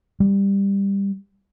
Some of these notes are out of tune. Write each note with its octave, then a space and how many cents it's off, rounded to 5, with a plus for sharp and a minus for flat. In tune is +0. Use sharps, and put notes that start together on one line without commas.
G3 +15